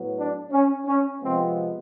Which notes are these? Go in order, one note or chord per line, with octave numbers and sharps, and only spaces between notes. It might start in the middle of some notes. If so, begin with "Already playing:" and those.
Already playing: A2 F#3 B3
D4
C#4
C#4
C3 F3 G#3 B3 C4